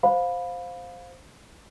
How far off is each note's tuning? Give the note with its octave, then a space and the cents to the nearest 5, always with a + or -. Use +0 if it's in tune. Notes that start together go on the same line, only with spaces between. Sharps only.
C5 +0 F5 +20 B5 +0